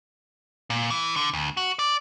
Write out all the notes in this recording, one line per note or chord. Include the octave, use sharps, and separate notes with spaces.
A#2
E3
D3
D2
F#4
D5